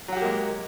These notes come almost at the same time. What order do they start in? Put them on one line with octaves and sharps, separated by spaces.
F#3 F#4 G4 A#3 G#3